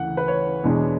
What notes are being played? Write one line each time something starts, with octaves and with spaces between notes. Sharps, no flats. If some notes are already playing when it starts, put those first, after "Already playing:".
Already playing: D2 C#3 E3 F#5
B4
C#5
E2 B2 G#3 D4